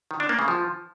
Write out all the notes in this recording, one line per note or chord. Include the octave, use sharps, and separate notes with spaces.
D#3
D4
A#3
C#3
F3